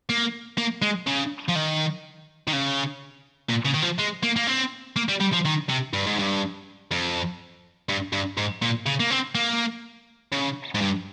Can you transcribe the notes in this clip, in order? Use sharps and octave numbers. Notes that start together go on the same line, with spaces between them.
A#3
A#3
G#3
C#3
F3
D#3
D#3
C#3
A#2
C#3
D#3
F3
G#3
A#3
A#3
C4
A#3
G3
G3
F3
D#3
C3
G2
G#2
G2
F2
G2
G2
G#2
A#2
C#3
A#3
C4
A#3
C#3
G#2
G2